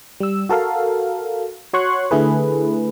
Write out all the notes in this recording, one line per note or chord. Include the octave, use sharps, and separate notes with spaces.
G3 E6
F#4 A4 A#4 F5
F#4 C#5 C6 C#6 F#6
D3 A3 E4 G#4 B4